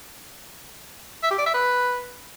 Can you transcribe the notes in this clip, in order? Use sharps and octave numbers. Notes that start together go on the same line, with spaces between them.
E5
G4
D5
E5
B4